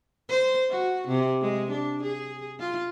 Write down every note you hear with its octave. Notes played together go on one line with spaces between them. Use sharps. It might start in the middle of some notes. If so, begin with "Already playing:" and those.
C5
F#4
C3
G#3
D4
G#4
F4